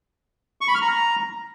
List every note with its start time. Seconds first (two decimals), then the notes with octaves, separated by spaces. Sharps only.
0.61 C#6
0.68 B5
0.75 F6
0.82 A#5